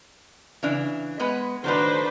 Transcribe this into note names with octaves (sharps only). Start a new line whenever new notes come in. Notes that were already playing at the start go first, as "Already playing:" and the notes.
C#3 E3 D4
G#3 B3 B4
A2 D#3 F#3 D4 B4 C5